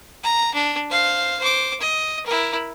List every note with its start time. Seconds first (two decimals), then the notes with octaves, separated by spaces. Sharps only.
0.23 A#5
0.54 D4
0.90 C5 F5
1.39 C5 D6
1.80 D#5
2.26 E4 A#4